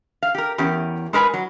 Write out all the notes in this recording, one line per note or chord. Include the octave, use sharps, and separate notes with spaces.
F5
G4 A#4
E2 C#4 G4 A#4
G#3 A#4 B4 G#5
F#3